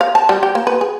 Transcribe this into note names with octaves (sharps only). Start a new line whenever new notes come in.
F5
A5
G3
G4
A#3
B4
G#4